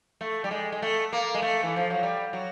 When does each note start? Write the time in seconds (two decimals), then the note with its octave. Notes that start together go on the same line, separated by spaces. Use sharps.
0.21 A3
0.44 G3
0.51 G#3
0.72 G#3
0.82 A3
1.13 A#3
1.34 G#3
1.42 A3
1.63 E3
1.76 F3
1.90 F#3
2.03 G3
2.33 F#3